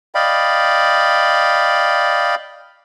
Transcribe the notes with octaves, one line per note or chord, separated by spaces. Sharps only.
D5 D#5 F5 G5 B5